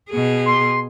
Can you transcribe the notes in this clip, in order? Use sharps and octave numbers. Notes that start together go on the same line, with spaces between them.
B2 G#4
C6